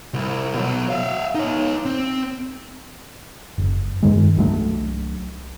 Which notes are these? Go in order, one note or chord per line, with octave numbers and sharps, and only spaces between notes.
C2
B2 F#3
E5 F5
D#4 C#5
C4
F#1
G2 D#3 G#3
C2 F#3 A3 D4